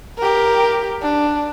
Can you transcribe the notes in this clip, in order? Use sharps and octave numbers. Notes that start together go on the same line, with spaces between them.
G4 A#4
D4